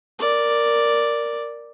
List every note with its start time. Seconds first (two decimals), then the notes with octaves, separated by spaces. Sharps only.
0.19 A#4 D5